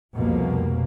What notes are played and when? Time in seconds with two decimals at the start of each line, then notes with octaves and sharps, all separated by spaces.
0.16 F1 C2 F2 B2 A#3